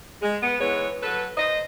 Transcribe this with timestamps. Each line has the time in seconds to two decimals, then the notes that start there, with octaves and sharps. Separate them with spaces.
0.22 G#3
0.43 B3
0.60 E3 G#3 B3 C#5
1.03 F#3 A4 B4
1.38 C5 D#5